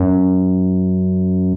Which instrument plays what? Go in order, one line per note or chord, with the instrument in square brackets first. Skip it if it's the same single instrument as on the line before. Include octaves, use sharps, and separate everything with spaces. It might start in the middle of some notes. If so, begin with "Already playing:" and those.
Already playing: [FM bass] F#2